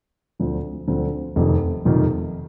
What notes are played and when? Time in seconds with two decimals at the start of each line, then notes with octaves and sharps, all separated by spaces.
0.39 D2 D3 F3 C4
0.87 D2 D3 F3 C4
1.36 F1 F2 C3 D#3
1.85 F1 F2 C3 D#3